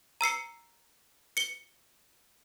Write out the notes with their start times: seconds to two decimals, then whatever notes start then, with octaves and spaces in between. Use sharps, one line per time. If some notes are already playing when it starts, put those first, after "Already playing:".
0.21 A#5 E6 C7 C#7
1.37 C#7 G7